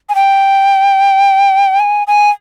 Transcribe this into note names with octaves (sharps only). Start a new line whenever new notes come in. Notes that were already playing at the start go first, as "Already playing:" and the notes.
G#5
G5
G#5
G#5